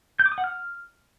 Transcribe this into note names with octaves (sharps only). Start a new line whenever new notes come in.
G6
D6
D#6
F#5
F6